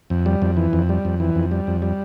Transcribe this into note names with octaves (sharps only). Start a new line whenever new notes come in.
F2
G3
F2
E3
F2
G3
F2
E3
F2
G3
F2
G3